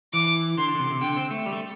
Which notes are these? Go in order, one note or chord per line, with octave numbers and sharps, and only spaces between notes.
E3 D6
D3 C6
D3
C3
C3
D3 G5
C4
A3
G3
A3